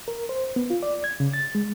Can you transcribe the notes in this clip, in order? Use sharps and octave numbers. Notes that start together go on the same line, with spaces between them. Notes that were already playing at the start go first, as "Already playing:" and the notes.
A#4
C5
B3
F4
D5
G#6
C#3
A6
G#3